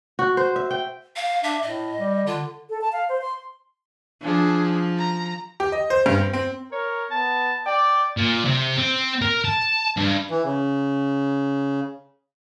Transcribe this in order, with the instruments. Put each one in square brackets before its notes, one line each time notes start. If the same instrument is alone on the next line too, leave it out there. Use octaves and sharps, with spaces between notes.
[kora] F#4
C5
E5
G5
[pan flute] F5
[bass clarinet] D4 [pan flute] E5
[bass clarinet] A2 [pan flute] D#5
[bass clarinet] G3
[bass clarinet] D3 [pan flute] F4
[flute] A4
A5
F5
C5
C6
[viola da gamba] F3 [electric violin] D4 G#4
[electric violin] A#5
[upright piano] G4
D#5
C5
G2
C4
C4
[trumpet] A#4 [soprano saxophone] C#5
[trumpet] B3 [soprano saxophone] A5
[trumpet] D5 [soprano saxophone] G5
[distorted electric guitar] A#2
C3
C4
A#4
A5
G2
[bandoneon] E3
C#3